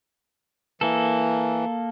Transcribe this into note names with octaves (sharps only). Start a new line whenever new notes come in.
E3 A#3 A4